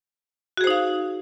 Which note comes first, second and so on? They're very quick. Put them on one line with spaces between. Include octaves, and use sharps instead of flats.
F#4 G#4 C5 D#4 F5